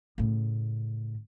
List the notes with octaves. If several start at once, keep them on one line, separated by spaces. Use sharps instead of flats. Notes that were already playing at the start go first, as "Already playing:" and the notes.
A2 C#3